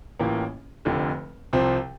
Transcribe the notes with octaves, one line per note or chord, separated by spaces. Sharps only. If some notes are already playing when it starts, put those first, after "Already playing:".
A1 A2 E3 A#3 F4
F1 F2 D3
C2 C3 F3 C4